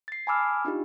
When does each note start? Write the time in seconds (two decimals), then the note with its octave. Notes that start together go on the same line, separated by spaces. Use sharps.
0.08 A6 C7
0.27 G#5 A5 B5 D6 E6 F6
0.65 D4 D#4 F4 G4